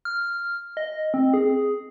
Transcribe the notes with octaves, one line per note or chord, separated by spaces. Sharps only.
F6
D#5
C4
G#4